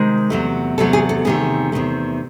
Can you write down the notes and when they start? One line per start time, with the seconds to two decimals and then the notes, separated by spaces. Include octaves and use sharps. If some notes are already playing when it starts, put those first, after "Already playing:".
Already playing: C3 D#3 G#3
0.30 E2 C3 F#3 A3
0.78 E2 C3 F#3 A3 A4
0.93 G#4
1.09 A4
1.25 E2 C3 D#3 A3 G#4
1.72 E2 C3 D#3 A3